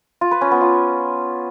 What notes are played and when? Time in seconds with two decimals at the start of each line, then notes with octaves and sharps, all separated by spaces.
0.21 F4
0.31 B4
0.41 C#4
0.51 B3
0.61 F4